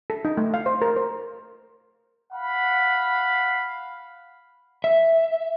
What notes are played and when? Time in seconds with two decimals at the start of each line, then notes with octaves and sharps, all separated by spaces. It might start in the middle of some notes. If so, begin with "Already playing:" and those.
0.10 A4
0.25 D#4
0.37 A3
0.54 F5
0.66 C5
0.82 A#4
0.96 C5
2.31 F5 F#5 B5
4.84 E5